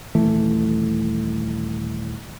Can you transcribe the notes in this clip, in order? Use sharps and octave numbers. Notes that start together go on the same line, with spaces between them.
D#1 E3 A3